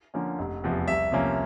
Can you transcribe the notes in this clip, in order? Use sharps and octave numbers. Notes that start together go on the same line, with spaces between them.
D3 F3 A#3 C#4
F1
E2 C3 F3
C2 E5
C3 F3 A#3 C#4